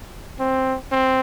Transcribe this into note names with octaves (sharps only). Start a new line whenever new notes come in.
C4
C4